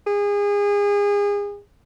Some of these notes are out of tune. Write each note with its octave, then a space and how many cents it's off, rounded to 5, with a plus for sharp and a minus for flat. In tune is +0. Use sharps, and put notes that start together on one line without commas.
G#4 -30